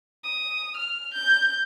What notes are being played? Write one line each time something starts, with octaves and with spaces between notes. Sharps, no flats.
D#6
F6
G6